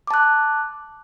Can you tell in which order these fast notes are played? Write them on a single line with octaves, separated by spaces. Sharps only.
D6 A5 F#6